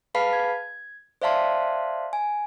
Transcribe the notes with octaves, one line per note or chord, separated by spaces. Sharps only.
G#4 B4 F5 A5 B5 C7
G#6
C5 D5 E5 F5 A5 C6
G#5